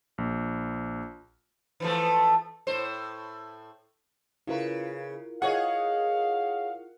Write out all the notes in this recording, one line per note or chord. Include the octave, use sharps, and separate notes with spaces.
A#1
E3 F3 A3
A2 C5
C#3 E4 F4 A#4 B4
G#4 C#5 D#5 F5 F#5